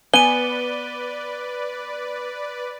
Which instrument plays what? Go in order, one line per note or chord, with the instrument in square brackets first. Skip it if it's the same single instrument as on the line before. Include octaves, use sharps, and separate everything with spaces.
[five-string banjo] B3 G#5 [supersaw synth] B4 D5 [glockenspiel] D#7 G7